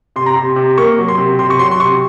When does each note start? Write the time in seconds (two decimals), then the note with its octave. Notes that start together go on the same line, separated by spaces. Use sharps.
0.16 C3 C6
0.26 A#5
0.36 C3 C6
0.56 C3
0.78 A#3 C#6
0.98 F#3
1.08 C6
1.18 C3
1.39 C3 C6
1.50 C#6
1.59 F#3 C6
1.71 C6
1.80 C3 C#6